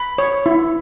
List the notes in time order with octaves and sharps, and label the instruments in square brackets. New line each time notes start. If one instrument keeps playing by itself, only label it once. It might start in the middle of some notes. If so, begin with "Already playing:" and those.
Already playing: [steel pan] B5
C#5
E4